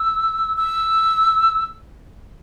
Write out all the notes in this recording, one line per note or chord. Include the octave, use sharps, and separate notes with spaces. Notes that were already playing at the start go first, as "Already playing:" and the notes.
Already playing: E6
E6